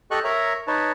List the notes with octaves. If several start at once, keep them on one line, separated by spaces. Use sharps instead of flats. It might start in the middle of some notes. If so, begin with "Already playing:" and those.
G4 A4 D#5 C#6 F#6
A#4 C#5 E5 A#5
D#4 B4 C#5 A5